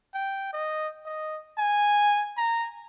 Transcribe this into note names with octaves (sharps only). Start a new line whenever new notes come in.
G5
D#5
D#5
G#5
A#5